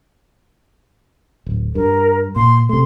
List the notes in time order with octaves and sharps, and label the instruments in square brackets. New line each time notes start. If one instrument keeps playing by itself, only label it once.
[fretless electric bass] D1
[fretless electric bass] G2 [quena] A#4
[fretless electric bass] A#2 [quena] C6
[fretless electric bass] C3 A3 [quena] C6